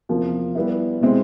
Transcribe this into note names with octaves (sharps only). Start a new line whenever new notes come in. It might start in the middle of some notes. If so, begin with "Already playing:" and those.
E2 C3 F3 A#3
G3 B3 E4
B2 G#3 C4 E4